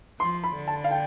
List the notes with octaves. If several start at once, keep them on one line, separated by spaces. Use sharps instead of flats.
F3 C6
B5
D3
A5
F5
G5